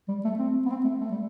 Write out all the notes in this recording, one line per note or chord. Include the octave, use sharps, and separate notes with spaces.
G3
A3
C4
B3
C4
A3
A3
G3